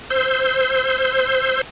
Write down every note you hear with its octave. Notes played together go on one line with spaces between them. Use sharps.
C5 E6 G6